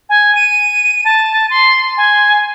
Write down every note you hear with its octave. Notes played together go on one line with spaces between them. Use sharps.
G#5
D#7
A5
C6
G#5